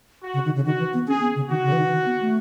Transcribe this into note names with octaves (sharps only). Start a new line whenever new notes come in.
F#4
C#3
D#3
C#3
D#3 F#4
E3
B3
C#4 G#4
B3
C#3
D#3 F#4
C#3
E3
D#3
D#3
B3
A3